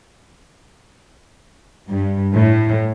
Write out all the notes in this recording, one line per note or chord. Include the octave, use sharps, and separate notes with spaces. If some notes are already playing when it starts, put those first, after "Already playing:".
G2
A2